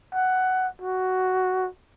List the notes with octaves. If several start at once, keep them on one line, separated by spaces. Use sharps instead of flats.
F#5
F#4